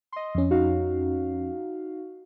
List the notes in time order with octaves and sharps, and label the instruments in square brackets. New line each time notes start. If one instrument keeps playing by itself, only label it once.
[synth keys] D#5 C6
[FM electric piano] F2 C#4
[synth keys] D#4 F#4 F5